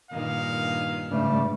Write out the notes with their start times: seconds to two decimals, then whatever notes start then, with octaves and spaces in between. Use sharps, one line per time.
0.11 G2 A#2 D#3 F5
1.11 G#2 C#3 E3 G3 A3 D4